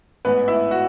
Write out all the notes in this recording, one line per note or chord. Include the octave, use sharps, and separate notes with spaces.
A1 G#2 E3 B3 B4
E4 E5
F#4 F#5